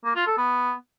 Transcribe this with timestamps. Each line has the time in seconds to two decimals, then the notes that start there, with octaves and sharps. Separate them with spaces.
0.05 A#3
0.16 F4
0.27 A4
0.38 B3